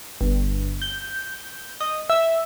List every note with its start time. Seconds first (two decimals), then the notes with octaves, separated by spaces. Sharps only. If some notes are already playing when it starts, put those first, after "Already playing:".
0.21 G1
0.82 G6
1.81 D#5
2.10 E5